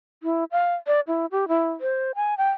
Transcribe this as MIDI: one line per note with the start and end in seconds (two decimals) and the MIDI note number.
0.23 0.44 64
0.52 0.75 77
0.87 1.00 74
1.08 1.26 64
1.31 1.48 67
1.48 1.70 64
1.81 2.12 72
2.15 2.37 80
2.38 2.50 79